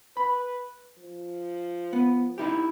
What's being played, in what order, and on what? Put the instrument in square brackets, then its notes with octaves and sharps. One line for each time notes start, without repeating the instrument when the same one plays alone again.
[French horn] B4 [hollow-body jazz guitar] B5
[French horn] F3
[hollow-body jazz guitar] B3
D#4 E4 G4